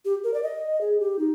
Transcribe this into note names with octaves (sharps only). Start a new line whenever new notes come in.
G4
A#4
D5
D#5
G#4
G4
D#4